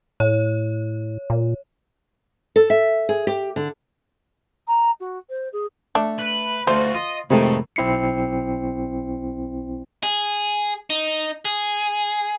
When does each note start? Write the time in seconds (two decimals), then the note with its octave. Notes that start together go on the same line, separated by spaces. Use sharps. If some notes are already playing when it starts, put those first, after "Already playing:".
0.20 A2 C#5
1.30 A#2
2.56 A4
2.70 E5
3.09 G#4
3.27 G4
3.56 D3
4.68 A#5
5.00 F#4
5.29 C5
5.53 G#4
5.95 A3 D4
6.19 B4
6.67 D2 A3 F4 F#4 C5
6.95 F4 D#5
7.31 F2 A2 C3 D#3 G#3 A3 F5
7.76 B1 C4 E4 C7 C#7
10.03 G#4
10.90 D#4
11.45 G#4